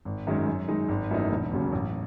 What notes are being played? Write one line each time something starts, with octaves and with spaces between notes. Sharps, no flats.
G#1
F#2 D#3 G#3 C#4
F#2
D#3 G#3 D#4
G#1
F#2 E3 A3 D#4
E1
D#2 C#3 F#3 C#4
A1